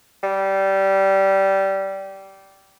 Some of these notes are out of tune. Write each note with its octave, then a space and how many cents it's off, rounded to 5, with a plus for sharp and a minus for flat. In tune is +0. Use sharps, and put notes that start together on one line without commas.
G3 -15